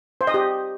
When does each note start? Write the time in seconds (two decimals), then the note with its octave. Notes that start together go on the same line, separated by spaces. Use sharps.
0.21 C5
0.27 D#5
0.34 G4